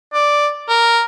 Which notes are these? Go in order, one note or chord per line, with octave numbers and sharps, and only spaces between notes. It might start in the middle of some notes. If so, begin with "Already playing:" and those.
D5
A#4